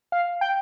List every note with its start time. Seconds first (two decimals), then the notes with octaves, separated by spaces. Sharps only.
0.12 F5
0.41 G5